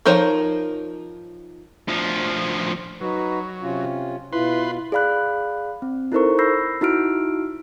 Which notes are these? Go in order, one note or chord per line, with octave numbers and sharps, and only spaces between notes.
F3 D#4 A#4 C5 C#5
D2 F3
F#3 D#4 F#4 B4
C3 C#4 F4
B2 E4 F4 B4 C6
G#4 D5 F5 B5 F#6
C4
D#4 E4 A4 A#4 C5 C#6
B5 E6 G6 A#6 C7
D#4 E4 F#4 E6 F6 D7